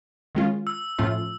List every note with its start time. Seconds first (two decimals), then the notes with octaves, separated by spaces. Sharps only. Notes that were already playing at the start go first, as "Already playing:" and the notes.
0.35 D#3 G#3 C#4 F4
0.67 E6
0.98 A2 F3 A3 C#4 F4